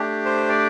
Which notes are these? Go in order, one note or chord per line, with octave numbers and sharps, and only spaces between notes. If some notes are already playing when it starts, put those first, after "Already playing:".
Already playing: A3 D4 G4
C5
D5